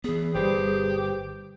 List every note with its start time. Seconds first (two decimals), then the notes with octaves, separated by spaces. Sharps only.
0.04 E3 B3 G#4
0.35 G1 B2 G3 G4 B4 C5